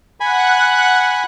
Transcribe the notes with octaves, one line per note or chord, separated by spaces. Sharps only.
F#5 G#5 B5 F#6